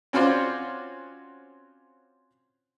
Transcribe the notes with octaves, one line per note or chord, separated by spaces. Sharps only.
C4 C#4 F4 F#4 C5 D5